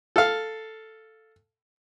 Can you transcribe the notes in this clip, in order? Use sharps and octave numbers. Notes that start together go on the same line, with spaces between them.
A4 F5